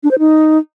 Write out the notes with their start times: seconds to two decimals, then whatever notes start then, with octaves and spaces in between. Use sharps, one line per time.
0.03 D4
0.11 C5
0.19 D#4